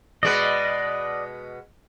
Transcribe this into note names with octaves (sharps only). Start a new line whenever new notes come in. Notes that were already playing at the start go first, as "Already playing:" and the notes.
B2 G#3 B3 B4 D5 D#5